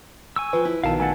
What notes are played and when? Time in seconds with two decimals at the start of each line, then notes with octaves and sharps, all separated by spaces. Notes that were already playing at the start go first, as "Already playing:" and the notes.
0.36 G#5 C#6 E6
0.53 F3 B4 G5
0.65 E4
0.84 A#1 B2 D#3 F5 A5
1.00 A3 A4 F#5 G#5 A5